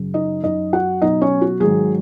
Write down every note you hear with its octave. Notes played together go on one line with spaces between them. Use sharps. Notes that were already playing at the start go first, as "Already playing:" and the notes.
Already playing: F#2 C#3 F#3
D#4 D#5
F#2 F#3 D#4 D#5
F#4 F#5
B2 F#3 D#4 D#5
C#4 C#5
F#4
G#2 D#3 F#3 G#4